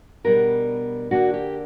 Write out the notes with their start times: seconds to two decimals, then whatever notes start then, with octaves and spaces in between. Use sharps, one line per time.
0.24 B2 G3 B3 D4 A#4
1.11 D3 A#3 D4 F#4
1.34 G4